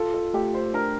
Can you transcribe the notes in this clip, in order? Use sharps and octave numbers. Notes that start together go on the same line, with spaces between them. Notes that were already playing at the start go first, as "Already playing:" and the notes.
Already playing: F4 A4
A4
A3 G4
C5
D4 A#4